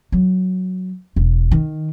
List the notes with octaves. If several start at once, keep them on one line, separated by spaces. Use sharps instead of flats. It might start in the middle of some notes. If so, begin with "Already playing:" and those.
F#3
E1
D#3